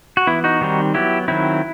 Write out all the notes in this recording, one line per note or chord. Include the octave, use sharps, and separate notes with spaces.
F#4
E3 B3 E4
D#4 F#4
D#3 G3 C4
F#3 B3 E4 G4
D#3 F#3 C4 E4